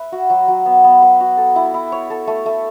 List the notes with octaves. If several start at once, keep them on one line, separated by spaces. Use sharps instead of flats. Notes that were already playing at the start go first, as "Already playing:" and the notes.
Already playing: B4 E5
F#4
F#3
F#3
B3
B3
B4
F#4
A4
E4
E4
C#5
A4
A3
A3